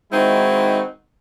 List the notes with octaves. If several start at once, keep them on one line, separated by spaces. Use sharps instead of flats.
D#3 G#3 C4 D#4 E4 F#4